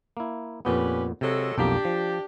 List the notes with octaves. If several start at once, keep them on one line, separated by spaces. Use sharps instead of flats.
A#3 E4
F2 A#2 B3 C#4 G4 B4
C3 F#3 G#3 A4
B1 F2 A#3 D4 G4
F3